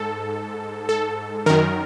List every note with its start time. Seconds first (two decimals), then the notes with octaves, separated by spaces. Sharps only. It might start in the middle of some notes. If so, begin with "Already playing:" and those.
Already playing: G#2 A4
0.89 A4
1.46 F#2 D#3 A#4